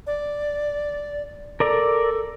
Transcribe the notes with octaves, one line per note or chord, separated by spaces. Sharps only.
D5
A4 A#4 D5 A#5